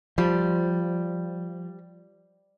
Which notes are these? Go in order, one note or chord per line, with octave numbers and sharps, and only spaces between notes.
F3 G3